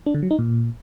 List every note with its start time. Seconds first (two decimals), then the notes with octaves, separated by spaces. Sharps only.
0.06 D4
0.15 D3
0.23 F#3
0.31 D#4
0.39 A#2